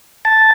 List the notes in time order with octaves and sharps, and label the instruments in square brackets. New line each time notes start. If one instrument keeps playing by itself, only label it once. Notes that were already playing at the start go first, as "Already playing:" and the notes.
[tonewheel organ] A5